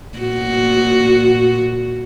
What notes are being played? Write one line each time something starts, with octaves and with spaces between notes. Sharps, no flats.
A#2 F#4